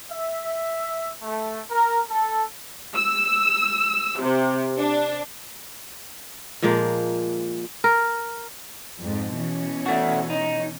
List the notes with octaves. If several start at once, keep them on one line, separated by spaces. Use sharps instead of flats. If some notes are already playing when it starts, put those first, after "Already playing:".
E5
A3
A#4
A4
E6
C3
D4
A#2 F3 G#3 A#3
A#4
F2 G#2
B2 E3 C#4
A3 F#4
D#4